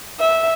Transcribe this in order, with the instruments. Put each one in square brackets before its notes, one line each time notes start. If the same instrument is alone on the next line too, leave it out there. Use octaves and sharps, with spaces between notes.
[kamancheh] E5